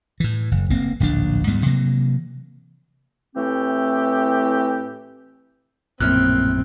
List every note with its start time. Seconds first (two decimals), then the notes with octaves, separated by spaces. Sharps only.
0.20 A2 E3
0.51 F#1
0.70 F1 A#3 C4
1.00 D1 A#1 D#2 D4
1.47 D2 G#2 G3 B3
1.66 C3 E3 F#3 A#3
3.36 A2 E3 A3 C4 G4
6.01 A#1 F#2 A2 A#3 C4 F6 F#6